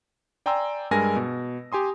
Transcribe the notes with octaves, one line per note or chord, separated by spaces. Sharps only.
D5 G5 G#5 A#5 C6 E6
G2 G#3 A#4 G#5 A#6
B2
G4 G#5 C6 D#6